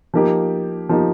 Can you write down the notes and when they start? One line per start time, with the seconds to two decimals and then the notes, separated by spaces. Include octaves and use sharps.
0.14 F3 A#3 D#4 G4
0.89 F3 A#3 D#4 G4